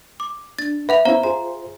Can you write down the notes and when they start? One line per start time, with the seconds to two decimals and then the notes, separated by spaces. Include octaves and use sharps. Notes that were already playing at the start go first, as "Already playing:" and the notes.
0.20 D6
0.59 D4 A6
0.89 B4 E5 F#5 F7
1.05 B3 C#4 E4 C5 F5 A#5
1.23 F4 G#4 C5 A#5